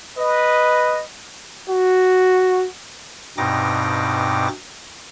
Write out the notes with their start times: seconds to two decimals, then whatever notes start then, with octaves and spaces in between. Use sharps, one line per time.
0.18 B4 D#5
1.70 F#4
3.38 G2 B2 C4 D#4 D6 A#6